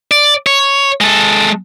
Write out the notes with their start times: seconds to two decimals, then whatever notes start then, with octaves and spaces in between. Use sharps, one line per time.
0.11 D5
0.47 C#5
1.01 G#3 A4